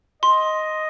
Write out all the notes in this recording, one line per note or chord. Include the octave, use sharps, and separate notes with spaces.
D#5 C6